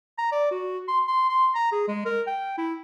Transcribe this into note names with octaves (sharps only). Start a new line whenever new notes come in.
A#5
D5
F#4
C6
C6
C6
A#5
G#4
G#3
A#4
G5
E4